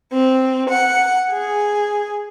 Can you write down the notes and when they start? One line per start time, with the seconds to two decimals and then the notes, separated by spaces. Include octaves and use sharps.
0.13 C4
0.70 F#5
1.31 G#4